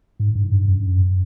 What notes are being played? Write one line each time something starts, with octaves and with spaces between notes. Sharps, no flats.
G#2
G2
G2
F#2